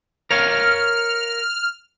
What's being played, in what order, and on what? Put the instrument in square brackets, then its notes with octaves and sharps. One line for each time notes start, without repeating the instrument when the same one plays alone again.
[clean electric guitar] A#4 C#5 F5 [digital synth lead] F6